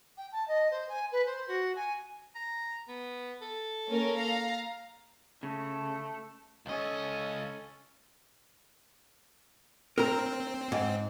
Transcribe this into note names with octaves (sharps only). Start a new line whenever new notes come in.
G5
A5
D#5
C5
G#5
B4
C5
F#4
G#5
A#5
B3
A4
A#3 C#4 A#4
F5 A#5
C#3 A3
C#2 C#4 A4 D#5
C4 A#4 A#5
G#2